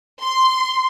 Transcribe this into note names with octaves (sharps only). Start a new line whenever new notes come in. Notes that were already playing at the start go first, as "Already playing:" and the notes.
C6